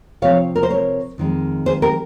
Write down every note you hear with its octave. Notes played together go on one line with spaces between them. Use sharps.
C3 F3 C4 C#5 F5
A#4
C5
A#4 C#5
F2 D#3 G#3
G#4 C5
G4 A#4